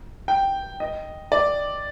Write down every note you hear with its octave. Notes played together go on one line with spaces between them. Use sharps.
G5
D#5
D5